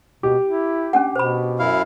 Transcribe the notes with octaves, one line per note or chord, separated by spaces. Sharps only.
B2 G4
E4
C#4 D4 F#5
B2 C5 B5
F#2 E4 F5